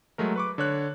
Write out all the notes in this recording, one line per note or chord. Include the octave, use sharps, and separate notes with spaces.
F#3 G#3 A3 A#4
B4 C#6 D6
D3 C#5 F#6